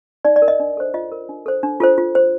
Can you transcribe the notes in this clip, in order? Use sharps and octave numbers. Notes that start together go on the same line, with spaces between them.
D#4 D5
D5
A#4
D#5
D4
A4 C5
F4 D#5
A#4
D4
A4 C5
D4
F4 A4 C5
F4
C5